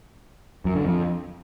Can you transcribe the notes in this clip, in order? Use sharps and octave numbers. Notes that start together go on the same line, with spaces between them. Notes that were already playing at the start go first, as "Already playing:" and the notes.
F#2
D3
F2